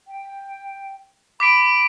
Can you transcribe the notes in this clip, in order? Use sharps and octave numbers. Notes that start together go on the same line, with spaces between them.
G5
B5 D6 B6 D7